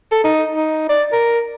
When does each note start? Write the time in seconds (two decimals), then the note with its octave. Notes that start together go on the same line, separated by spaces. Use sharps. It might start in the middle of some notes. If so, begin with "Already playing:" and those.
0.12 A4
0.24 D#4
0.55 D#4
0.89 D5
1.12 A#4